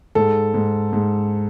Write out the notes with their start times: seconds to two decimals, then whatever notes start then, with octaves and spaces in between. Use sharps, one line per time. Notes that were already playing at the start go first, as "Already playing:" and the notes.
0.15 G#2 A4
0.54 G#2
0.93 G#2